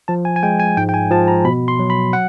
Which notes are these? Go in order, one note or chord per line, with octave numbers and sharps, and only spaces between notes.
F3 A5
G#5
G#5
G#3 G5
G#5
G#2 G5
G5
G#5
F3 A5
A#5
B2 B5
C6
F#3
B5
F#5